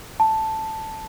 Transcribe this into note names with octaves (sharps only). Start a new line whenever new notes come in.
A5